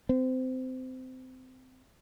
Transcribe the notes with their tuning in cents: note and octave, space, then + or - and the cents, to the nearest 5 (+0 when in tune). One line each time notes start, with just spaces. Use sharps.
C4 -25